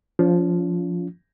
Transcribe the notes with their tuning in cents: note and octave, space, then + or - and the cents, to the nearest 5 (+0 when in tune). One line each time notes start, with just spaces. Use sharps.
F3 +0 C#4 +45 F4 +0